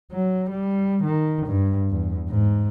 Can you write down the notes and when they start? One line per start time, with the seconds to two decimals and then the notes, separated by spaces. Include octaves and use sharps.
0.12 F#3
0.49 G3
1.03 D#3
1.47 G2
1.90 E2
2.29 G#2